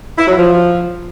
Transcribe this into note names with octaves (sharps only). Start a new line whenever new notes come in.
E4
F#3
F3